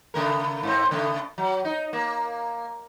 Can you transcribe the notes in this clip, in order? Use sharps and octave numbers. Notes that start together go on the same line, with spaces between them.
C#3 A3 A#4
G#2 C4
C#3 A3
F#3
D#4
A#3